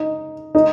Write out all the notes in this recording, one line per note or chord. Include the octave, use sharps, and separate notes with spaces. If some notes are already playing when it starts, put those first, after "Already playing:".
Already playing: D#4
D#4